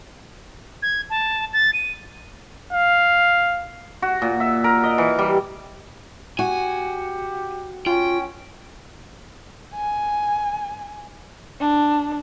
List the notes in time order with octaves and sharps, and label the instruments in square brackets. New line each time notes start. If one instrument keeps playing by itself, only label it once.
[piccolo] G#6
A5
A6
D#7
[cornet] F5
[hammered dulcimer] F#4
A#2
E5
A#4
D#5
E3
G3
[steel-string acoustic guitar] F#4 [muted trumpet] G4 [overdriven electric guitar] G#5
[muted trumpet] C#4 [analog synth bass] F4 [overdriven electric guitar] G5
[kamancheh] G#5
D4